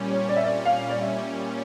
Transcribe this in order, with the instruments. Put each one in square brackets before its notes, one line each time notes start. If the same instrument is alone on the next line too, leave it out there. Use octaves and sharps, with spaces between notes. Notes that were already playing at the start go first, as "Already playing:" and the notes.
Already playing: [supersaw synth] A#2 G3 C#4
[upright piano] C#5
D5
E5
D5
F5
D5
E5